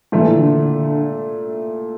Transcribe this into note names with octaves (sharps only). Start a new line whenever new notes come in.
A#2 E3 A3 E4 A4
D3
D3
D3